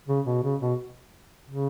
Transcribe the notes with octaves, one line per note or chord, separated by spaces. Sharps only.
C#3
B2
C#3
B2
C#3